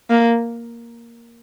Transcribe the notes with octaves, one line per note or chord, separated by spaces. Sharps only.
A#3